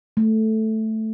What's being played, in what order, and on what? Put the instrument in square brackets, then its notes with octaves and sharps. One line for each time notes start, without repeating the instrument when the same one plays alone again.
[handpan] A3